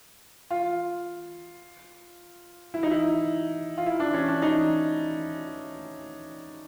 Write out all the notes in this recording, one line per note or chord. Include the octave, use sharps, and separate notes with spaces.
F4
E4
D#4
E4
F4
E4
D4
C#4
D4
D#4